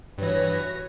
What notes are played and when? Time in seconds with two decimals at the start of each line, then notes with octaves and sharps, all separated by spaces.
0.18 G2 E3 F#4 B4 C#5 A#6